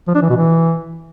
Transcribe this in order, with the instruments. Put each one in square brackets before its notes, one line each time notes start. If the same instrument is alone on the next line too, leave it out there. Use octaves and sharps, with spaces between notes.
[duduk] F3
D4
E3
B2
E3